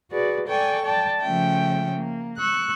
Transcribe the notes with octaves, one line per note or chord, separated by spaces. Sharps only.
F#4 G#4 B4 D5
A4 D5 G5 G#5 C#6
D5 G5 A5
C#3 F3 A3 C#4 E5 G5
A#3
C#6 E6 F#6